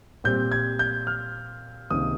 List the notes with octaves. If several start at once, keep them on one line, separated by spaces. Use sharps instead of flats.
A#2 G3 C4 G6
G#6
G6
F6
C#2 C3 D#3 A#3 D#6